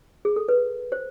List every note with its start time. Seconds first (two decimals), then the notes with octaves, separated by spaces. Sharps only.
0.25 G#4
0.36 A4
0.48 B4
0.92 C5